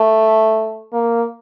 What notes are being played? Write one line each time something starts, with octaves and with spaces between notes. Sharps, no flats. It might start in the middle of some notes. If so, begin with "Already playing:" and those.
Already playing: A3
A#3